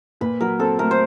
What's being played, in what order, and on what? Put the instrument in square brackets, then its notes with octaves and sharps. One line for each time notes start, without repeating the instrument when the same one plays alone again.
[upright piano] A#2 [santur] B4
[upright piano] F#3 [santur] A#4
[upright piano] C4 [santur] A4
[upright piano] A3 [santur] A#4
[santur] C5